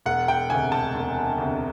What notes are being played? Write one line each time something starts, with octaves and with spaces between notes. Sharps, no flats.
E1 F#5
G5
D2 C3 G#5
A5
E1
D2 C3